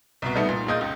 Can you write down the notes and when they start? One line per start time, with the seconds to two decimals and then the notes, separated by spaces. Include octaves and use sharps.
0.22 C2 B2
0.36 G3 A3 B3 D#4
0.49 A#2
0.66 A#1 G#3 A#3 D#5 G6
0.81 C#2